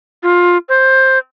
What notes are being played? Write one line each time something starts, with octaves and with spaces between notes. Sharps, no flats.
F4
C5